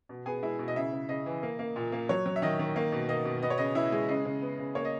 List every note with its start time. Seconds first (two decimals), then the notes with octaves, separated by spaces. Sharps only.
0.09 B2
0.26 B3 G#4 G#5
0.42 G#3 E4 E5
0.59 B2
0.68 D#5
0.76 C#3 E4 E5
0.93 C#3
1.09 C#3 D#5
1.26 E3
1.43 A#3
1.59 A#3
1.76 A#2
1.92 A#3
2.09 F#3 C#5
2.26 F#3
2.36 E5
2.42 D#3 D#5
2.59 D#3
2.76 A#3
2.92 B2
3.09 A#3 D#5
3.25 B2
3.42 B3 D#5
3.50 C#5
3.58 C#3 D#5
3.75 B3 E4 E5
3.92 G#3
4.09 C#3 D#5
4.25 C#3
4.42 B3
4.59 C#3
4.75 A#3 C#5
4.85 D#5